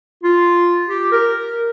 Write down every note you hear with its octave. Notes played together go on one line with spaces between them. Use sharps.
F4
G4
A#4